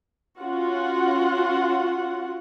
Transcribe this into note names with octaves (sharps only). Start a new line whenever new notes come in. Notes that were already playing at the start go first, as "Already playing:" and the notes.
C#4 F4 F#4 F#5